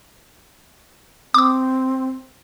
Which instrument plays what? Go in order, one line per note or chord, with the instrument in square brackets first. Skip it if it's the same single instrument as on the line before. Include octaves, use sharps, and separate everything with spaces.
[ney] C4 [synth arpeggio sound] D6 D#6